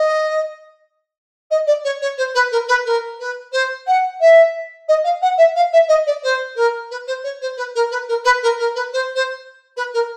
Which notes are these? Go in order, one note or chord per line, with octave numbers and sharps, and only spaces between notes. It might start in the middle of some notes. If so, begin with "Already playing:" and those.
Already playing: D#5
D#5
D5
C#5
C#5
C5
B4
A#4
B4
A#4
B4
C5
F#5
E5
D#5
F5
F#5
E5
F5
E5
D#5
D5
C5
A#4
B4
C5
C#5
C5
B4
A#4
B4
A#4
B4
A#4
A#4
B4
C5
C5
B4
A#4